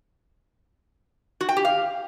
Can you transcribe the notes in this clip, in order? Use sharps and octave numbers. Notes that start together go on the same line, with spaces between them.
F#4
G5
G4
F5